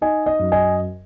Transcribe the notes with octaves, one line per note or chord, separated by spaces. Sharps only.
D#4 D#5 G#5
D#5
F#2
D#5 G#5